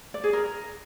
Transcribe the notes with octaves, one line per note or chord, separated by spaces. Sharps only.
D5
G#4
A#4